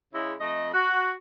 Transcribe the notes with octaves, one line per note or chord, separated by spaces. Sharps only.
C#3 G#3 C#4 E4
F2 A3 D#5
F#4